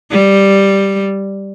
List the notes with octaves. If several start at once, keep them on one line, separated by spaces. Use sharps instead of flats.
G3